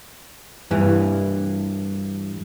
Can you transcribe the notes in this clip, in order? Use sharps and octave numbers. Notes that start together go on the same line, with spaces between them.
G2 E3